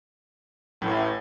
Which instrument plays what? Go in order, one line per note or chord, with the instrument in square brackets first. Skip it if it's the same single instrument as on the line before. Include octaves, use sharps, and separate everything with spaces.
[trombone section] A1 [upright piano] A2